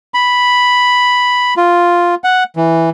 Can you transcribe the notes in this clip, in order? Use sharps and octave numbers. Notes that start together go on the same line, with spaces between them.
B5
F4
F#5
E3